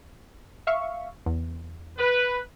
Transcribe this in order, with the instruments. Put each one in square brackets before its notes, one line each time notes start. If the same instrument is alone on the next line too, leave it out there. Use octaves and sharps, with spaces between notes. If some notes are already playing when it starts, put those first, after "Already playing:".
[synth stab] E5 F5 C#6
E2
[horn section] B4